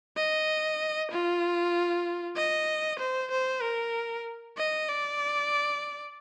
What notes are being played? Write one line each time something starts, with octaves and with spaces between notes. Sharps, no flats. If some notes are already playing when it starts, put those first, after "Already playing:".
D#5
F4
D#5
C5
C5
A#4
D#5
D5